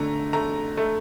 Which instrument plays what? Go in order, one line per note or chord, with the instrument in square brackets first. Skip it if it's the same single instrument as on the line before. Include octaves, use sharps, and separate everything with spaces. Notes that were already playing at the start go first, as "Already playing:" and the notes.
Already playing: [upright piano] D3 A3 A#5
A3 A#5
A3